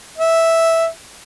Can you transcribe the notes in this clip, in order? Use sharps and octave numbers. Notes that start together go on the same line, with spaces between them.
E5